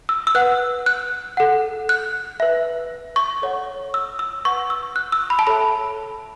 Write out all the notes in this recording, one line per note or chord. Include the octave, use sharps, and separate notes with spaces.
E6
E6
B4 F#5 F#6
F#6
A4 F#5
F#6
B4 E5
C#6
A4 C#5 F#5
E6
E6
B4 F#5 C#6
E6
F#6
E6
B5
A5
A4 C#5 E5 B5